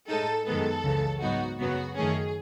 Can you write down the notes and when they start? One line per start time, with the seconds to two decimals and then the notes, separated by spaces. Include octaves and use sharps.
0.09 A2 G#3 D#4 A4
0.46 F#2 D#3 G#3 B3 A4
0.84 C#2 C#3 E3
1.21 G#2 F#3 B3 D#4 F#4
1.59 F#2 C#3 F#3 B3 F#4
1.96 F#2 D#3 A3 C#4 G#4